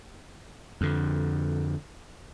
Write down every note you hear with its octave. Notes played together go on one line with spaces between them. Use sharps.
F2 D3